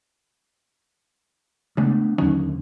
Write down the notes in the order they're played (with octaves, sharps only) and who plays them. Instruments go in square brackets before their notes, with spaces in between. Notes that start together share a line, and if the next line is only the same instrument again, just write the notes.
[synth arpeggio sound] C#3 G#3 [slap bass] A3 B3 D4
[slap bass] D#2 D3 [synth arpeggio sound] F#3 C#4 D#4